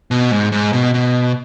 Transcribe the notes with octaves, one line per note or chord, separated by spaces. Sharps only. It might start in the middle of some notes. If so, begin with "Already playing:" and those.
B2
G#2
G#2
B2
B2